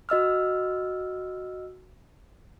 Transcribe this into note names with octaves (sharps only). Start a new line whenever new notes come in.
F#4 D#5 E6 F6